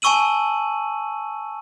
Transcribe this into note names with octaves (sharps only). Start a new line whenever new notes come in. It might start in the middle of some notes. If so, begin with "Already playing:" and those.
G#5 A5 C#6 E6 D#7 F#7